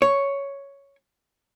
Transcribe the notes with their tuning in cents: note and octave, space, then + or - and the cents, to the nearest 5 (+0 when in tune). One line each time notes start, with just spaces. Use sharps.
C#5 +5